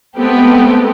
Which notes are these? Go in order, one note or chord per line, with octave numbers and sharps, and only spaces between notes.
G#3 A3 B3 C4 G4 A4